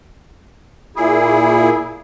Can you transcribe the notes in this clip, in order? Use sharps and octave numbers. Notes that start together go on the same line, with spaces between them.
A#2 E4 G#4